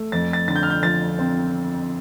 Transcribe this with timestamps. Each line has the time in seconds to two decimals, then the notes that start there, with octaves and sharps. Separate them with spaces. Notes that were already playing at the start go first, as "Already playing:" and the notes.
Already playing: A3
0.12 F2 A6
0.33 A6
0.48 D3 A6
0.56 G6
0.63 F6
0.70 G6
0.83 F3 A6
1.19 C4